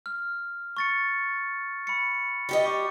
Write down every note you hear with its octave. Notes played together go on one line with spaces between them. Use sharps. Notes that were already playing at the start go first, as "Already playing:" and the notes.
F6
C#6 A6 C#7
B5 C#7
G3 G4 D#5
C#6 D6